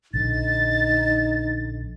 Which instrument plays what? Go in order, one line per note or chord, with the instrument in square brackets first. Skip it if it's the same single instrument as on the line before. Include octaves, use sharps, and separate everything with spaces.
[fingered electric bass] A#1 D3 [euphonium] D#4 [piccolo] A6